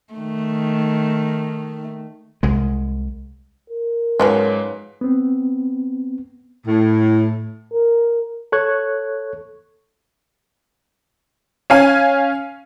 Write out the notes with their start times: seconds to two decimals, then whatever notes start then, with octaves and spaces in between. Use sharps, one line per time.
0.14 D#3 A3
2.43 C2 G#3
3.70 A#4
4.20 G#2 F3 F#3 G#3 C#4 B4
5.01 B3 C4
6.66 A2
7.73 A#4
8.52 A4 C#5 C#6 F#6 G#6
11.70 C#4 F5 G#5